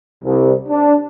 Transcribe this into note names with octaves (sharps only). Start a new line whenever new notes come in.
C2
D4